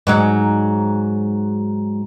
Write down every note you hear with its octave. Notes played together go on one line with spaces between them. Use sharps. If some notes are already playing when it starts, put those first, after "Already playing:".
G#2 F#3 D#4